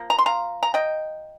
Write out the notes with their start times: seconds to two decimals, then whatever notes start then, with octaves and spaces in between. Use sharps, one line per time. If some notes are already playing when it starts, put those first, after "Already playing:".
Already playing: F3 A#3
0.10 A#5
0.18 C6
0.26 F5 A#5
0.63 A#5
0.74 D#5 G5